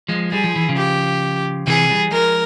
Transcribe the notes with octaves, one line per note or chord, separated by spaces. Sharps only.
F3 G#3
G3 G#4
F3
E3
C#3 F3
G4
C3 E3 G#4
E3 G3
F3 G#3 A#4